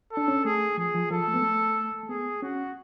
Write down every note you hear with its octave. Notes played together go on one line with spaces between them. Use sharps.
A4
D4
C#4
A3 G#4
F3 G#4
F3
F3 A4
A3
B3
A3
A3
B3 G#4
C#4 F#4